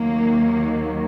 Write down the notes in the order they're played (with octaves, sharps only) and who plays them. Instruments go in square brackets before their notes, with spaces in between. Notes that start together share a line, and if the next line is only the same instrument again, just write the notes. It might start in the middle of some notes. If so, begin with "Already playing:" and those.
Already playing: [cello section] D#2 D#3 F#3 A#3